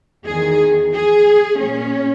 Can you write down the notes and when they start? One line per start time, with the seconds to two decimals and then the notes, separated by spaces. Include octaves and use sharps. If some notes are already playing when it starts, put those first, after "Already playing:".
0.24 E2 D#3 G#4
0.93 G#4
1.60 A#2 C#4